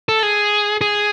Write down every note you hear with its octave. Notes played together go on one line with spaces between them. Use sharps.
A4
G#4
G#4